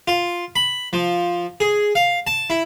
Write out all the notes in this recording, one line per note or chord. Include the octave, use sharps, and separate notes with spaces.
F4
B5
F3
G#4
F5
A5
E4